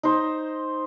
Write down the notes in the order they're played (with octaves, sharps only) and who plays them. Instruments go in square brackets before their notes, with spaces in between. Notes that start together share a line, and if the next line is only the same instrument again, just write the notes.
[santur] D#4 C5